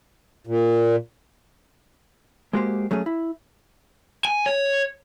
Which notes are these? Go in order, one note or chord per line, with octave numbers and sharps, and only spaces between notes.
A#2
G#3 A#3 F#4 G4 C5
F#3 A3 C#4 G#4
E4
G#5
C#5